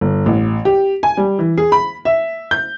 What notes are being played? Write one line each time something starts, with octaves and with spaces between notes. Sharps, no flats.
G1
A1
G4
G#5
G3
E3
G#4
B5
E5
G6